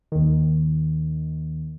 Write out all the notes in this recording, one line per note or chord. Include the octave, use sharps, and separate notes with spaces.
D#2 D#3